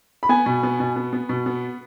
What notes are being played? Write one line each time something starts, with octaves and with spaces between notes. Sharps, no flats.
B5
B3 G#5
B2
B3
B2
B3
B3
B2
B3